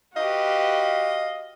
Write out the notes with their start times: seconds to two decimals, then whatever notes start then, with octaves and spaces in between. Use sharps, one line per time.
0.16 F#4 G4 B4 D#5 F5